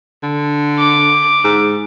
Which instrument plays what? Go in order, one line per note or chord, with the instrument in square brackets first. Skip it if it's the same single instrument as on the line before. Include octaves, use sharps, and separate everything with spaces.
[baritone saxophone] D3
[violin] D6
[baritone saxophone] G#2